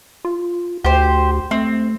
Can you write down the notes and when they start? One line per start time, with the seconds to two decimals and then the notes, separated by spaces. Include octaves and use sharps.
0.25 F4
0.84 D2 G4 C5
1.51 A3 C4